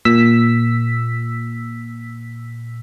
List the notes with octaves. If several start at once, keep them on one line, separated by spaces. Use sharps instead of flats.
A#2 E6 B6